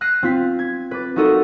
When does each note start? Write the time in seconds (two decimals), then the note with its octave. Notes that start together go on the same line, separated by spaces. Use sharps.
0.01 F6 F#6 A#6 C7 D#7
0.23 C4 F4 B6
0.59 G#6
0.91 B4 D6 A6
1.16 D#4 F4 F#4 A4 A#4 D#5